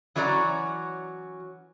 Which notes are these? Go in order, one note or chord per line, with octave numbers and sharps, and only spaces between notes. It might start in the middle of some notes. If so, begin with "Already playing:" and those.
E3 F#3 C#4 F#4 D5 A#5